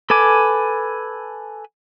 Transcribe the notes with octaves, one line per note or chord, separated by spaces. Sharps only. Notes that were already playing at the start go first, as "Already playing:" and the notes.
A4 B4 G#5 D6